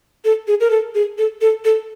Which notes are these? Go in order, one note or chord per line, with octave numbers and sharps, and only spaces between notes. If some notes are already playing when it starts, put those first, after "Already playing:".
A4
G#4
A#4
A4
G#4
A4
A4
A4